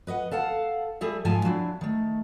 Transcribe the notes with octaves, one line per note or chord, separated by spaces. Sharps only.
B4 D#5 E5 F#5
A4 F5 F#5 A5
G3 G#4 A4 E5
G#2 F3 F4 G#5 A5
F#3 D4 E4
D#3 A3